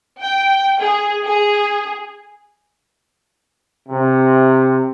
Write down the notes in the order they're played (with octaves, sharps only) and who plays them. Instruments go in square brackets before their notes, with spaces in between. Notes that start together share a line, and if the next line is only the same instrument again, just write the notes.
[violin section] G5
G#4
G#4
[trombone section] C3